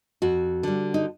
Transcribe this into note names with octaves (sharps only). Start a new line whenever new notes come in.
F2 F#4
D3 G3
D#4